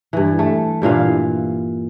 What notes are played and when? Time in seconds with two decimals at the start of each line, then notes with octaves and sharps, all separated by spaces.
0.13 G2 E3
0.39 A3
0.82 G2 A#2 E3 F5